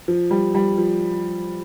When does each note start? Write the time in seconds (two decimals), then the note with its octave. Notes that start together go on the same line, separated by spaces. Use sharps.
0.08 F3
0.31 G3
0.55 G3
0.78 F3